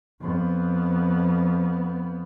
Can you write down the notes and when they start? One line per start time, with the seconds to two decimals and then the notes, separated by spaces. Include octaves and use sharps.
0.21 F2 B3